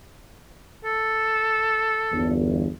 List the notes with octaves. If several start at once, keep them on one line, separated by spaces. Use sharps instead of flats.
A4
G1 E2